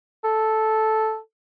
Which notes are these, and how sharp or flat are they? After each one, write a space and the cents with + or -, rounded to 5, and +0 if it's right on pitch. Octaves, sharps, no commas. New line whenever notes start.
A4 -5